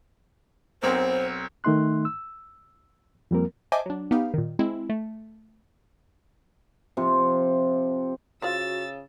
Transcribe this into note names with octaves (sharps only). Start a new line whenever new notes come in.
B1 C4 A#4 C5
D#3 A3 D#4 E5 C6 F#6
E6
F2 F3 G3 A#3 C4 A#4
C5 D#5 E5 G#5 A5 D6
F#3 D4
B3 D#4 G4 F5
A#2 D#3
G#3 C4 E4
A3
C3 F3
C#3 F4 F#4 C5 D5 E6 A6